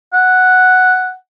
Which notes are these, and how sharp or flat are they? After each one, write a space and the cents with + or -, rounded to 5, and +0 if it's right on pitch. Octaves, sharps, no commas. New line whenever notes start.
F#5 +0